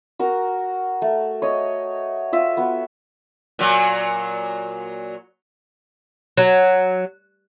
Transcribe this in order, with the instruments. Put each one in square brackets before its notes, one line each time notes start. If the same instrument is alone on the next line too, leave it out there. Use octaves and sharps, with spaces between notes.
[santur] F#4 A#4 A#5
A3
C#5 D#5
F4 E5
B3 F#4
[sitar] A#2 F#3
[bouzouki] F#3